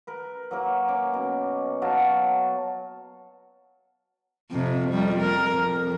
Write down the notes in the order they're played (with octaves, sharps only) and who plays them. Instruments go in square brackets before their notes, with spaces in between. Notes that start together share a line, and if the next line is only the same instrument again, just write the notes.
[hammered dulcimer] A#4 B4
F#3 A#3 A#4
C#4 D6
B2
F#3 F#4 F5 A5
[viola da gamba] F2 C3
F2 G3
A#4
F2